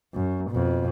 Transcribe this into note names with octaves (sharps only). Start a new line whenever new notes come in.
F#2
F2 B2